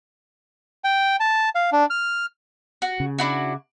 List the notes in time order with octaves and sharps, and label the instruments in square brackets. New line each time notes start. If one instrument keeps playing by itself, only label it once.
[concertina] G5
A5
F5
D4
F6
[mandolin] F#4
[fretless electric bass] C#3
[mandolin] D4 E4 F#4